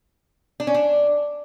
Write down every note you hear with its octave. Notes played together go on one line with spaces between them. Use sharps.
D4
C#4
D4